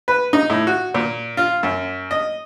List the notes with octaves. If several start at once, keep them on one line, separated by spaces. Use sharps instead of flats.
B4
D#4
A2
F#4
A#2
F4
F#2
D#5